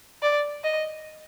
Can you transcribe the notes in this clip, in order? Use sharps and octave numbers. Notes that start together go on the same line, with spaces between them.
D5
D#5